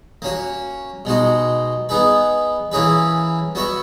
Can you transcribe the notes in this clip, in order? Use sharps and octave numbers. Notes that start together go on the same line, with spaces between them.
A#3 C#4 F#4
B2 G#3 D#4 F#4
B3 D#4 G#4 B4
E3 A#3 C#4 G#4 B4
B3 F#4 C#5 E5